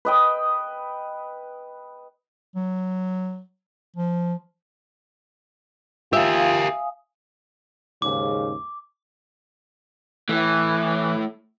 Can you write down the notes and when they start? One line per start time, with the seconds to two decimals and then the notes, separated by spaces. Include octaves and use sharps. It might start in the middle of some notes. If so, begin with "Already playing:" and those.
0.05 B4 D#5 G5
2.55 F#3
3.96 F3
6.13 F4 G4 A#4 E5 F5 G#5 D#6
8.02 D#2 G#2 C#3 D6
10.29 E3 A3 E4